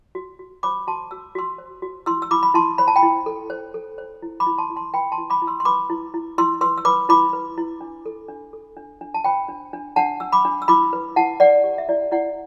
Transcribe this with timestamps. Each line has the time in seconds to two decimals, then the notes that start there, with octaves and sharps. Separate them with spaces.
0.15 F#4
0.39 F#4
0.63 C5 B5 D6
0.87 F#4 A5 C6
1.11 F#4 E6
1.35 F#4 C6 E6
1.58 C5
1.82 F#4
2.06 E4 C6 E6
2.22 E6
2.31 E4 B5 D6
2.43 B5
2.54 E4 A5 C6
2.78 C5 B5
2.88 A5
2.96 G5 B5
3.03 E4
3.26 A4
3.50 C5
3.74 A4
3.98 C5
4.22 E4
4.40 B5 D6
4.46 E4
4.58 A5 C6
4.70 E4
4.76 A5 C6
4.94 B4 G5 B5
5.12 A5 C6
5.18 E4
5.30 B5 D6
5.42 E4
5.47 C6 E6
5.60 C6
5.65 B4 B5 D6
5.90 E4
6.14 E4
6.38 E4 C6 E6
6.61 B4 C6 E6
6.78 E6
6.85 B4 B5 D6
7.09 E4 B5 D6
7.33 B4
7.58 E4
7.81 D4
8.06 A4
8.28 D4
8.53 A4
8.77 D4
9.01 D4
9.14 A5
9.24 C5 G5 B5
9.48 D4
9.73 D4
9.96 D4 F#5 A5
10.20 D4 E6
10.32 B5 D6
10.45 D4
10.62 E6
10.68 E4 B5 D6
10.93 B4
11.16 E4 F#5 A5
11.40 B4 D5 F#5
11.64 G4
11.78 E5
11.89 E4 D5
12.11 E4 D5 F#5